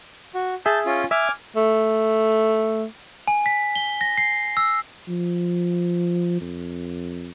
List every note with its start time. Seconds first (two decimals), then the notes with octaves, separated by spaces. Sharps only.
0.35 F#4
0.66 G#4 E5 A5 G6
0.86 C#4 F4
1.11 E5 G#5 D6 F6
1.56 A3
3.28 G#5
3.46 B6
3.75 G7
4.01 A#6
4.17 C7
4.57 E6
5.08 F3
6.41 F2